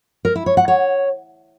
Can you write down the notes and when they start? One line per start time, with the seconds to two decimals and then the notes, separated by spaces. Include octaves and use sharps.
0.25 A#4
0.35 E4
0.46 C#5
0.57 F#5
0.68 C#5